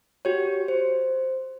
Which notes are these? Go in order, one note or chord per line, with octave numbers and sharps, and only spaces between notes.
F#4 G4 C#5
C5